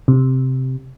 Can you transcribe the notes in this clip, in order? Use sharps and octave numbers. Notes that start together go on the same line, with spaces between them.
C3